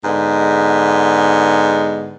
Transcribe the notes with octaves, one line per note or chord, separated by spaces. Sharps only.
G#2 D3 G#3 B3